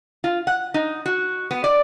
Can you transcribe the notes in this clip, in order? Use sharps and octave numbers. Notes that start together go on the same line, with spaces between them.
F4
F#5
D#4
F#4
B3
D5